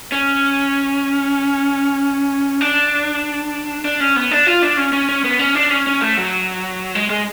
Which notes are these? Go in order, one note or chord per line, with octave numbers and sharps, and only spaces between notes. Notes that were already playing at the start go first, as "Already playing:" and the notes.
C#4
D4
D4
C#4
B3
D4
F4
D4
C#4
C#4
C#4
B3
C#4
D4
C#4
C#4
A3
F#3
G#3
G#3